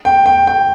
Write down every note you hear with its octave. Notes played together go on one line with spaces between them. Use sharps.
G5
G5
G5